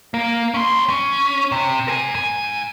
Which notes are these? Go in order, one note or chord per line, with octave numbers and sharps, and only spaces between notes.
A#3
C#4 C6
C#4
C3
A#4 G#5
G#2 G#5